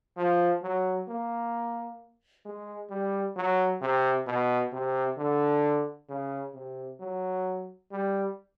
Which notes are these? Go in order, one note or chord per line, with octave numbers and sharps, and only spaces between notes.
F3
F#3
A#3
G#3
G3
F#3
C3
B2
C3
D3
C#3
C3
F#3
G3